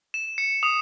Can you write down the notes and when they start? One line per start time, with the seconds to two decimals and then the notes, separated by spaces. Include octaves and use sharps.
0.14 E7
0.38 C#7
0.63 D#6